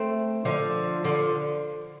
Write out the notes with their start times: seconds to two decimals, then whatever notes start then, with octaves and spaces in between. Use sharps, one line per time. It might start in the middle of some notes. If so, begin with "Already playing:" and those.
Already playing: A3 C4
0.45 D3 F3
1.04 D3 F3